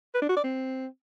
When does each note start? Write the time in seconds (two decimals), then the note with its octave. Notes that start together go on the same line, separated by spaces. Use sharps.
0.14 B4
0.22 D4
0.29 F#4
0.36 D5
0.43 C4